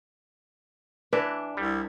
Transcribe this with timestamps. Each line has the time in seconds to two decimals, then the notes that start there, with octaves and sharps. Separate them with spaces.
1.13 E3 D4 B4
1.57 C2 G3